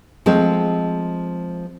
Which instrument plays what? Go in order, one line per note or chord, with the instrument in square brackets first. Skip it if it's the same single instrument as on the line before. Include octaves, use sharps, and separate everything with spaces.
[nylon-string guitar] F3 G#3 A3 C4